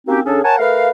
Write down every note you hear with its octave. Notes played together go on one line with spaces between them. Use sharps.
A#3 C4 C#4 D#4 F#4 G4
C#3 C#4 D4 G#4 A4
A#4 C#5 F#5 G#5 A5
A3 A#4 B4 F5